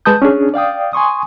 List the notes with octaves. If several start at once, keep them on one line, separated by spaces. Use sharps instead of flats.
G#3 B4 A5 D#6 G6
C#4 D4 G#4
D5 F5 G5 D#6
G#5 C6 C#6 D#6